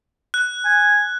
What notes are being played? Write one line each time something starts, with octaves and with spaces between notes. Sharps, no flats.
F#6
G#5